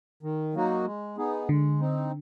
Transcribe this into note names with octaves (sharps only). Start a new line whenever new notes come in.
D#3
F#3 A#3 D#4 F#4
G#3
B3 D#4 G#4
D3 G#3
C4 D#4